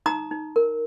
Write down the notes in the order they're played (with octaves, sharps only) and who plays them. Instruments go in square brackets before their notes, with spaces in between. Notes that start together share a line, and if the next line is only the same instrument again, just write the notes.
[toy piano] D#4 A#5 D#6
D#4
A#4